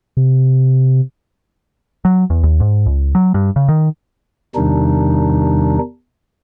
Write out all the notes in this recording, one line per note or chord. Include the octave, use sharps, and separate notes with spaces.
C3
F#3
E2
D#2
G#2
C#2
F#3
G2
C#3
D#3
E2 C3 D#3 G3 D4 D#4